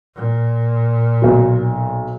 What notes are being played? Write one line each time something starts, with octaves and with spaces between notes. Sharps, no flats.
A#2
B1 F#3